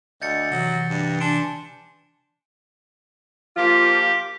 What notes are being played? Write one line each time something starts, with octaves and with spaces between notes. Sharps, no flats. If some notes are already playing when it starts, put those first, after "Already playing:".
D2 D#5 G6 A6 C#7
C3 E3 F#3
G2
D4 G#5 C6 D7
F3 A#3 F4 G4